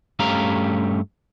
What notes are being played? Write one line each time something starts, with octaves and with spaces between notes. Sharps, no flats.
G2 A3 C#4 G4 F5 A#5